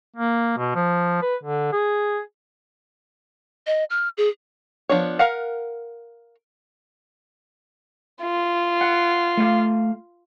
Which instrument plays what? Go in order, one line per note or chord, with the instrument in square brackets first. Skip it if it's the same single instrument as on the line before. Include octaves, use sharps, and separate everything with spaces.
[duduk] A#3
B2
F3
B4
D3
G#4
[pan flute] D#5
F6
G#4
[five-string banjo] F3 B3 D4 C#5
A#4 F5 F#5
[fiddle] F4
[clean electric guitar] F#5
A3 F5